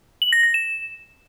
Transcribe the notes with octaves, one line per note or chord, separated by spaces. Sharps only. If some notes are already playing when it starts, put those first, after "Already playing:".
F#7
A#6
A#6
E7